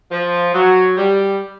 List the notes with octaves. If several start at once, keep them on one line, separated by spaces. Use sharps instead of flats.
F3
F#3
G3